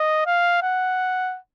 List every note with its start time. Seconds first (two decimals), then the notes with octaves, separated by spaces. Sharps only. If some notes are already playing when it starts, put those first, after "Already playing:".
Already playing: D#5
0.26 F5
0.63 F#5